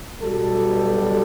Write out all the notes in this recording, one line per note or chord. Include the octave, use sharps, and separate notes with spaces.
B1 B2 G3 A4